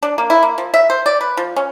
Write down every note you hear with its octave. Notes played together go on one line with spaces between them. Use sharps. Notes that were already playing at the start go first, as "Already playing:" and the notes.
D4
A#3
E4
A#3
F3
E5
C5
D5
B4
F3
C#4